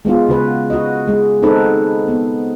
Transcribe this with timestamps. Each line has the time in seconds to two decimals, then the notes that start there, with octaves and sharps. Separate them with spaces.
0.05 G#3 B3 F4
0.29 C#3 F#4 B4
0.70 F#4 D#5
1.08 G#3
1.42 C4 D#4 F#4 A4 B4
2.08 B3